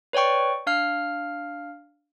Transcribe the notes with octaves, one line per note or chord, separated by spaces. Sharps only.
B4 C#5 D5 G5 C#6
D4 F5 F6